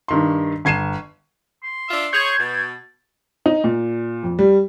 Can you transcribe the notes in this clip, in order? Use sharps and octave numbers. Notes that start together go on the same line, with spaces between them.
G2 D#3 C6
G1 G#6 C7 D#7 E7
C6
D4 F4 E5
G#4 C#5 G6 G#6
B2 A5
D#4
A#2
F2
G3